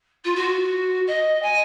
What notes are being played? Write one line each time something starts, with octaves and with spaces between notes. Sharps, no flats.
F4
F#4
D#5
G#5